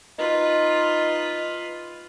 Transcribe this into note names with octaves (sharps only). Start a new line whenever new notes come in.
D#4 F4 B4